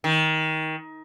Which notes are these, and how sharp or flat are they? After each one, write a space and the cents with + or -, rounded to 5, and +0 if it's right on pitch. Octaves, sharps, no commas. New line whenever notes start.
D#3 +20